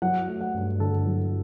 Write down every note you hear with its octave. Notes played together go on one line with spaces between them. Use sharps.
F#3 F#5
A3
F#5
G2
D3 A4
F#3